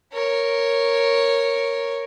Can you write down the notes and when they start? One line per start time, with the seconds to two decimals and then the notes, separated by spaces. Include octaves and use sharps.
0.13 A#4 C#5